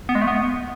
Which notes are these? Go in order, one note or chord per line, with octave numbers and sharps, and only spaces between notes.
B3
G#3
A3
B3